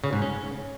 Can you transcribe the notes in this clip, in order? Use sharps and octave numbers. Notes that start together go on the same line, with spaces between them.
C#3
G#2
C#4